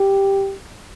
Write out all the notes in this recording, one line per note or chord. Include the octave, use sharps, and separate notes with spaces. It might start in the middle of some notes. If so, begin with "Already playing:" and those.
Already playing: G4